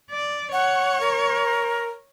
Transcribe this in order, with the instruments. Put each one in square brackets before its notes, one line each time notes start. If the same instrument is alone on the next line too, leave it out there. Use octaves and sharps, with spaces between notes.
[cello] D5
[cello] C#5 [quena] F#5
[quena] A#4